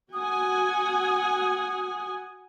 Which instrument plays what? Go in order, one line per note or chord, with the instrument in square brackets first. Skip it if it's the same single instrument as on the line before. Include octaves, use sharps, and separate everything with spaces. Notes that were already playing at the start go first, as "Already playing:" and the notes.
[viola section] F#4 F#5 G#5 [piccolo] D#6